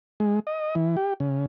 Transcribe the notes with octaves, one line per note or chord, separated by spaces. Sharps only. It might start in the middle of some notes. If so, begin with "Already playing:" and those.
G#3
D#5
E3
G4
C#3